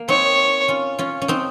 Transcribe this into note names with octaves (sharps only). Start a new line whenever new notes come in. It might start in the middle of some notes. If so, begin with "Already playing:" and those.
Already playing: A#3
C4 D#4 C#5
C#4 F4
C#4 F4
C#4
C4 D#4